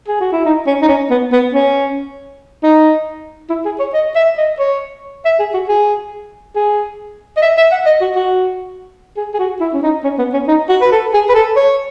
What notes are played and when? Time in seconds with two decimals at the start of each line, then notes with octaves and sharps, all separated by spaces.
0.08 G#4
0.21 F#4
0.32 E4
0.45 D#4
0.67 C#4
0.82 D#4
0.88 C#4
1.10 B3
1.32 B3
1.54 C#4
2.63 D#4
3.50 E4
3.65 G#4
3.79 C#5
3.94 D#5
4.15 E5
4.37 D#5
4.59 C#5
5.25 E5
5.39 G#4
5.54 F#4
5.68 G#4
6.55 G#4
7.37 D#5
7.42 E5
7.57 E5
7.72 F#5
7.86 D#5
8.01 F#4
8.15 F#4
9.17 G#4
9.34 G#4
9.39 F#4
9.60 E4
9.73 C#4
9.83 D#4
10.04 C#4
10.19 B3
10.33 C#4
10.47 D#4
10.69 F#4
10.81 B4
10.91 A4
11.13 G#4
11.29 B4
11.35 A4
11.56 C#5